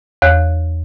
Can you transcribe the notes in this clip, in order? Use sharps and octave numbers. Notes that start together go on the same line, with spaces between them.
E2 C#5 F#6